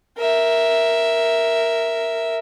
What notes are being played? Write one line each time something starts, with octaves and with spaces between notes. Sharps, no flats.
A#4 E5